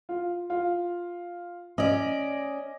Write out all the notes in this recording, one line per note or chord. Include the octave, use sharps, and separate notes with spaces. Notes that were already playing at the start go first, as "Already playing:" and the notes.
F4
F4
C#4 D5 D#5